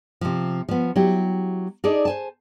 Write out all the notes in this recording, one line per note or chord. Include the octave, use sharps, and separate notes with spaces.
C3 F3
F3 B3
F#3 E4 G4
D4 D#4 G#4 A4 D5
C5 G#5 A5